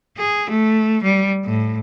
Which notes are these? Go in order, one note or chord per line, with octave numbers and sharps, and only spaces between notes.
G#4
A3
G3
A2